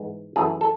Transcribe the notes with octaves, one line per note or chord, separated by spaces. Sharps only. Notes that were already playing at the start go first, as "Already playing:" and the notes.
Already playing: G#2 E3 G#3 B3
F#2 E3 A3 E4 G#4
A4